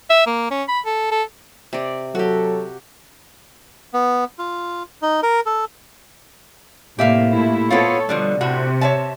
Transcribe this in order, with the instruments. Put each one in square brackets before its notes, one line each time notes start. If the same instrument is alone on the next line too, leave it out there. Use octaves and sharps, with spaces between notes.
[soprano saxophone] E5
A#3
C#4
B5
A4
A4
[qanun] C3 D5
[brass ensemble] F#3 A4 [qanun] F#4 G4
[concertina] B3
F4
D#4
A#4
A4
[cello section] A2 C3 A#3 [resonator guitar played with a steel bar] G4 E5 F5
[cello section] A#2 A3 E4
[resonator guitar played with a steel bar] B3 C4 F4 [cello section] A4 C#5
[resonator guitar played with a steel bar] B2 D3 F3 [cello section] G3
[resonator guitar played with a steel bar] A2 F#4 [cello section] C3
[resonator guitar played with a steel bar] C#5 E5 A5